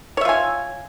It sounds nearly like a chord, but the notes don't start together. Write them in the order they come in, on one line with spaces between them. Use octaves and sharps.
C#5 E5 F4 G#5